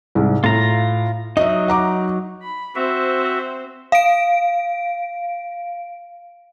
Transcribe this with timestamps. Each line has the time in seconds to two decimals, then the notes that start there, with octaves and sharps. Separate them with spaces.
0.15 C2 G#2
0.44 A2 F4 A#5
1.37 F#3 D#4 D#5 E5
1.68 F#5 A#5 D6
2.42 B5
2.75 C4 F#4 C5 E5
3.92 F5 D7